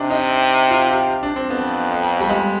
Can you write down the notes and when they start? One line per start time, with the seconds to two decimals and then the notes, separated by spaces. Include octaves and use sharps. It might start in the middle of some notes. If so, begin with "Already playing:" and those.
Already playing: C3 D4 D#4
0.10 D#4
0.70 F4
0.91 G4
1.23 D4
1.36 C4
1.50 F2 B3
2.20 G3
2.29 G#3